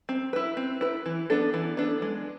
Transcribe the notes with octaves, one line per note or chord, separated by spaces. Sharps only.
C4
E4 B4
C4
E4 B4
E3
B3 D4 A4
E3
B3 D4 A4
G#3